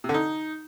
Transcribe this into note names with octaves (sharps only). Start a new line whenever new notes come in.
C3
D3
D#4